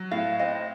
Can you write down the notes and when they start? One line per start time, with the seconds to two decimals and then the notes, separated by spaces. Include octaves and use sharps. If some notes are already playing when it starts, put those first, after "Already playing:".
Already playing: F#3
0.11 A2 F5
0.39 C4 D#5